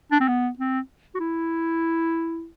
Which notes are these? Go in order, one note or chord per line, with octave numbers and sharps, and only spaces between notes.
D4
C4
B3
C4
F#4
E4